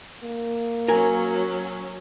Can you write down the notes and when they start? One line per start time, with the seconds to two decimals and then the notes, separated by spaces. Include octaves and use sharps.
0.23 A#3
0.88 F#3 C#4 A#4 B4 G#5